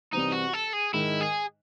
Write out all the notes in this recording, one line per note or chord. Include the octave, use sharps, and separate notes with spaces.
C2 C3 E3 C4 D#4
F#4
A4
G#4
G#2 D#3 G#3 D#4 E4
G#4